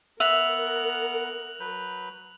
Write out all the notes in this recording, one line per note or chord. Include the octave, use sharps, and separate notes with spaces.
B3 A#4 E5 F#5 F#6 F7 F#7
F#3 B4 G6